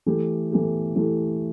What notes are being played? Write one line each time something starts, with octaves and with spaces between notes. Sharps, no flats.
E3 A3 E4 G4
E3 A3 E4 G4
E3 A3 E4 G4